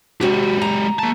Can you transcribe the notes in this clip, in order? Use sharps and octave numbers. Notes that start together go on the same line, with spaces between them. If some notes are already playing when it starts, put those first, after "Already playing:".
C3 G#3 F#4 G4
A#5
A#3 A5